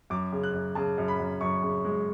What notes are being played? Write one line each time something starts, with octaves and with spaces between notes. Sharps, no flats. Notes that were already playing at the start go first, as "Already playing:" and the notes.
F#2 D6
C#3
F#6
F#2
C#3 A5
F#2
B5
F#2
F#2 C#6
C#3
G#3